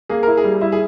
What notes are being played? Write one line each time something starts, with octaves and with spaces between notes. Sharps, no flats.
A#3 G#4
E4 A#4
G#4
G3
E4
G#4